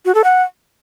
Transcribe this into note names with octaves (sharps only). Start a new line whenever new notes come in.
F#4
A4
F#5